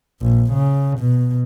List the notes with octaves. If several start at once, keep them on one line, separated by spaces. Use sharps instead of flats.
A#1
C#3
B2